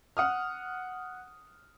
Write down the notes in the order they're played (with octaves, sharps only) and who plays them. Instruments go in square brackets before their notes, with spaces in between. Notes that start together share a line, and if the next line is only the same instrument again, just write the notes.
[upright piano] F#5 D#6 F6